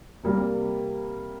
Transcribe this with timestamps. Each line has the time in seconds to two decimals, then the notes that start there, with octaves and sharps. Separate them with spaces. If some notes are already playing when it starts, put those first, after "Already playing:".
0.23 C3 G3 A#3